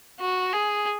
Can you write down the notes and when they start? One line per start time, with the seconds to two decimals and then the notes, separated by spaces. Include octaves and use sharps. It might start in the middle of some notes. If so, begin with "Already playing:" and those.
0.20 F#4
0.53 G#4